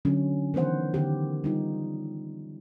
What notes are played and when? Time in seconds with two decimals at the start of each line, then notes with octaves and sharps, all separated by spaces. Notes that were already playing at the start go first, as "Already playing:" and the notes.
0.05 D3 F#3 C#4 D4
0.54 D#3 E3 B3 C5 F#5
0.94 D3 D#3 B3 G4
1.44 G3 D#4 F4